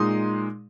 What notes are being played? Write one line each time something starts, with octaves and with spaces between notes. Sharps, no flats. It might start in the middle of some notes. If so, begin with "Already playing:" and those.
Already playing: A#2 G#3 D#4 C6 D#6